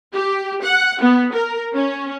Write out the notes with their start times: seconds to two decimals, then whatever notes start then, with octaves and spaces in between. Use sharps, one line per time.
0.14 G4
0.63 F#5
1.00 B3
1.33 A#4
1.73 C#4